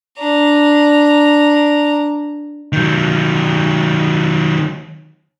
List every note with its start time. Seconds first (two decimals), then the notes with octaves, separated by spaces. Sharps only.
0.19 D4 A#5
2.73 D#3 F#3